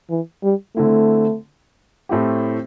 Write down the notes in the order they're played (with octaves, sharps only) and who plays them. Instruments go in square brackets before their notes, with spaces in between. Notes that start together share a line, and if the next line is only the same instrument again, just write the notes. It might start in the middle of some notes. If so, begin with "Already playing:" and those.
[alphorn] E3
G3
[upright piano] D3 C4 E4 [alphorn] A3
[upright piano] A2 A3 C4 E4 G4